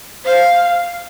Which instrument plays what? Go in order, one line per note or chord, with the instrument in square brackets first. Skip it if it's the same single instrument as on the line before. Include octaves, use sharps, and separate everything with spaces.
[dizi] C5 [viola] F5